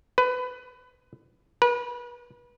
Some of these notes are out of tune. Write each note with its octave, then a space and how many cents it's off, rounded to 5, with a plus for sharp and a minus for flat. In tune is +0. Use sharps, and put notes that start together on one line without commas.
B4 +20
B4 -35